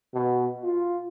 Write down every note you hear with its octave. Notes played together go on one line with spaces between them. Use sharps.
B2
F4